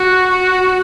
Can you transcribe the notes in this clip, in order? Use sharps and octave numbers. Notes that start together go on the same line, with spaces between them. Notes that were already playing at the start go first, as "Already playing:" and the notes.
Already playing: F#4
F#4